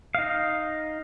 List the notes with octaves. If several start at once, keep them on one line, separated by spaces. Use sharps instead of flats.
D#4 F5